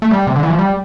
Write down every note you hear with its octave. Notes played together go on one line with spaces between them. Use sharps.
A3
G3
C3
D3
E3
F3
G3